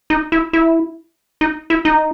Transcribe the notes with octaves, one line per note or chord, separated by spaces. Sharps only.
D#4
E4
E4
D#4
E4
D#4